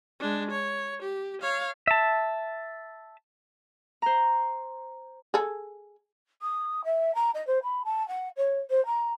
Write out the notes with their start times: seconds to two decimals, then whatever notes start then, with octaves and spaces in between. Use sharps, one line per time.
0.20 G#3 D4
0.51 C#5
1.02 G4
1.42 C#5 F5
1.87 E5 A5
4.02 C5 A#5
5.34 G#4 A4
6.42 D#6
6.84 E5
7.15 A#5
7.34 D#5
7.47 C5
7.63 B5
7.85 A5
8.08 F#5
8.37 C#5
8.70 C5
8.86 A#5